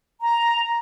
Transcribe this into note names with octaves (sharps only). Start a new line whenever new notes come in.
A#5